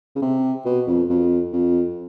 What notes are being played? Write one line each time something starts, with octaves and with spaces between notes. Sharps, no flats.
C#3
C3
B2
F2
F2
F2